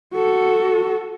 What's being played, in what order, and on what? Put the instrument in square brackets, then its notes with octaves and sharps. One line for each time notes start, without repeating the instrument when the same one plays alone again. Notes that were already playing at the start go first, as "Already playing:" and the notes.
[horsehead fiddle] F#4 A4